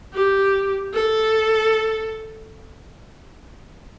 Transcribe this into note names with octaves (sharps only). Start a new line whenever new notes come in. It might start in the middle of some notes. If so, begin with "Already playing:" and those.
G4
A4